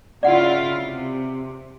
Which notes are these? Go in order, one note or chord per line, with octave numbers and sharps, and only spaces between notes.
C#3 E4 F4 D5 F#5
C3